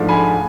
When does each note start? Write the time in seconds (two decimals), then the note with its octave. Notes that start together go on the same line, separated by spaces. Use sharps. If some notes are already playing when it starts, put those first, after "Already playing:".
Already playing: G#2 F3 A3 D4
0.08 G#5 B5